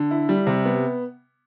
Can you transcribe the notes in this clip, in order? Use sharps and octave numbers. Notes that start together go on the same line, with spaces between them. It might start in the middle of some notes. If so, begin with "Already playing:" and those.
Already playing: D3
E4
G3
C3
B3